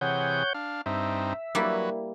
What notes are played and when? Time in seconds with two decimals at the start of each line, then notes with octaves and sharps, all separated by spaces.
0.01 C3 E3 G#4 C#5 F#5 G6
0.54 D4 F5
0.86 G2 C4 D#4 E5
1.55 F#3 G3 A#3 E4 B4